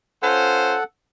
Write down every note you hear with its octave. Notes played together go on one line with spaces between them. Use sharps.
C#4 F4 A4 C5 F#5